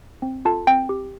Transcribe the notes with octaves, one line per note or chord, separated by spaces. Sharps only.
C4
F4 A4 A5
C4 G5
G4